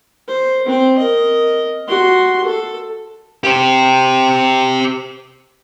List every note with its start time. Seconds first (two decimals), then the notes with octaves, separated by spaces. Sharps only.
0.28 C5
0.66 C4 C5
0.98 A#4 D#5
1.88 F#4 C6
2.44 A4
3.44 G4 C5